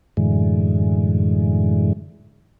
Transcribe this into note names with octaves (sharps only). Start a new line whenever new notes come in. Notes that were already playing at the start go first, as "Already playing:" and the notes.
F#2 A2 D3 E3 G#3